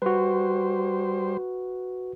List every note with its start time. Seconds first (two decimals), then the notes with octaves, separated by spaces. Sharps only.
0.02 G3 F#4 B4 C5